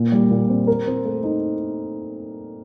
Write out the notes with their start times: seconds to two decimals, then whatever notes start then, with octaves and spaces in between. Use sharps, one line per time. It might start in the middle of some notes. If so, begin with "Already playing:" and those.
Already playing: A#2
0.12 G3
0.31 A#2
0.49 C4
0.67 A#4
0.87 C4
1.05 A3
1.23 D#4